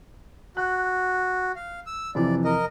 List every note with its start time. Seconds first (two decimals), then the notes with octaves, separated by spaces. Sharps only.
0.57 F#4 F#6
1.56 F5
1.87 E6
2.15 F2 C3 E3 D5
2.45 A#4 D#5